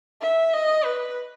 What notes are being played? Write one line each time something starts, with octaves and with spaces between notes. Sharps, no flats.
E5
D#5
B4